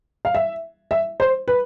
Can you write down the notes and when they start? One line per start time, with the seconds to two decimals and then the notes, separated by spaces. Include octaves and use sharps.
0.25 F5
0.35 E5
0.91 E5
1.20 C5
1.48 B4